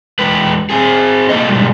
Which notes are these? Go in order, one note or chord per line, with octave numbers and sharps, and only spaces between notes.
E2 G#3 B4
C4 G#4
F#3 A#3 D#4 G#4 A4 D#5
G#2 B2 D3 D#3 G3 G#3